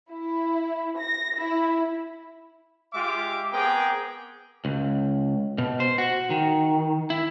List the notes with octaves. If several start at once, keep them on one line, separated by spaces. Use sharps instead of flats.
E4
A#6
E4
G#3 F4 G4 E5 D6
B3 C4 G#4 A#4 G5 D6
C#2
B2
C5
F#4
D#3
E4